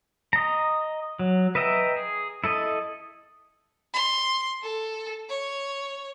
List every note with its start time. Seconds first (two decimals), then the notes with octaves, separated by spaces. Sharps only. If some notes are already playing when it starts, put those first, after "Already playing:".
0.33 D#5 A#5
1.19 F#3
1.55 B4 D#5 E5 G5 A#5
1.96 G#4
2.44 E4 A4 D#5
3.93 C6
4.63 A4
5.29 C#5